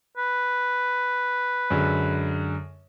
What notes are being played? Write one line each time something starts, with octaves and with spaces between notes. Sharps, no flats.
B4
F#2 D3 G#3